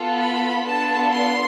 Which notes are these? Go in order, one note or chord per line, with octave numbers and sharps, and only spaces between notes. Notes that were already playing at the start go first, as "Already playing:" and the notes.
Already playing: B3 F4 A4
B5
B3 D4 F4 A4 A5
C6